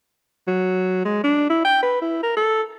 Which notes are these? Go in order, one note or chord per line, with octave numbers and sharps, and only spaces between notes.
F#3
G#3
D4
E4
G5
B4
E4
A#4
A4